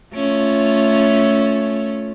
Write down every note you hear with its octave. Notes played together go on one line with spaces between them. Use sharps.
A3 C#4 F4